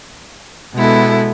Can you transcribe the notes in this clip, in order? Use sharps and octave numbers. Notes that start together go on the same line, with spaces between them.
B2 G#3 B3 E4 A4